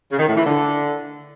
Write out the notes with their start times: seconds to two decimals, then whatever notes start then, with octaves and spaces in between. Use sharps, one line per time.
0.10 C#3
0.19 D#3
0.28 A2
0.36 E3
0.45 D3